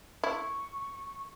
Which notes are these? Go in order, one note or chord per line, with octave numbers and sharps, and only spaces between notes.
E4 C#6